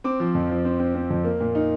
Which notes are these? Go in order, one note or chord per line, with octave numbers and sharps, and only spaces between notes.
C4 D6
F3
F2
F3
C4
C4
C4
F2
A#3
A#2
D#4